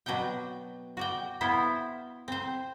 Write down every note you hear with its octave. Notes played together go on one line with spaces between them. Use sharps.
B2 F#3 D4 F#5 G5
F#4 D5 G5
B3 E4 C5 E5 F5
C4 C5